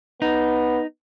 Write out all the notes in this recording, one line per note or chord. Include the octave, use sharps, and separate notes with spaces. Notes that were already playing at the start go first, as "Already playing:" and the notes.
B3 D#4